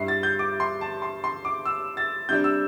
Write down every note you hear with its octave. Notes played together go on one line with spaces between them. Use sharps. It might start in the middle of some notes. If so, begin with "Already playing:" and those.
Already playing: G2 G3 E4 C7
A6
G6
D6
C6
A5
C6
C6
D6
E6
A6
C3 G3 D4 G6
E6